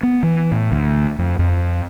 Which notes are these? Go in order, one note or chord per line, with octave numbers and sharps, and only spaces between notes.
B3
E3
A2
D2
F2
F2